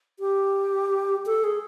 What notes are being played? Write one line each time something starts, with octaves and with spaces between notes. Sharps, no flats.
G4
A4
G#4